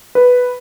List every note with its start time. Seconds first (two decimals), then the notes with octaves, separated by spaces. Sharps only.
0.15 B4